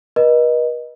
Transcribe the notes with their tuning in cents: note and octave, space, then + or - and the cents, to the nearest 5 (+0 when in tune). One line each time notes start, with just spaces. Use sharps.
B4 -45 D#5 -5